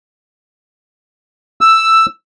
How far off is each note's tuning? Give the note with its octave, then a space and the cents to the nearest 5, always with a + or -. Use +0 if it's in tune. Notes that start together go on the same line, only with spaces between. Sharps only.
E6 +5